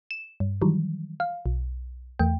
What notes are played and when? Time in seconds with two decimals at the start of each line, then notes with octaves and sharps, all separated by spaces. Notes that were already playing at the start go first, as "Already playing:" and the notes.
0.11 E7
0.40 G2
0.62 D#3 E3 F#3 G3
1.20 F5
1.46 B1
2.19 E2 A3 G5